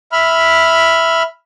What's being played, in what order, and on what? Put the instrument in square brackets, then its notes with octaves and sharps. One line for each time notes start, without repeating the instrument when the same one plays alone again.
[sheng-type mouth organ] E5 B5 F6